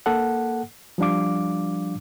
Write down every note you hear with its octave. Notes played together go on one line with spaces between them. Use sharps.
A#3 A4 F#5
F3 G3 D4 F5 D6